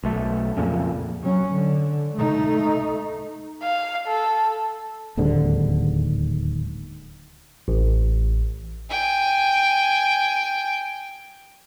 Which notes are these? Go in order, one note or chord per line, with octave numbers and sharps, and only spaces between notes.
B1 A3
F2 A#2 C#3
F#3 C#4
D3
A3 D#4
F5
A4
D1 D#2 G#2 D3
A1
G5 G#5